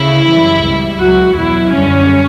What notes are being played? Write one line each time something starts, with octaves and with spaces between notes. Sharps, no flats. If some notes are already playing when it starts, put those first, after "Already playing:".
Already playing: D2 C#3 E4
F#2 E3 G3
C#2 B2 G3
C#2 B2 F#3 F#4
E2 B2 F#3 E4
F#2 D3 G3 C#4